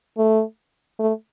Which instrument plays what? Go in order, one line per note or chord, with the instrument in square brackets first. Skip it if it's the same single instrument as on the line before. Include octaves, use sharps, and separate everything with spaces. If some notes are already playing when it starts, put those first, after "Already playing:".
[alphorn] A3
A3